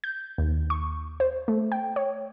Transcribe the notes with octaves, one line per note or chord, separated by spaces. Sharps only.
G6
D#2
C#6
C5
A3
G5
C#5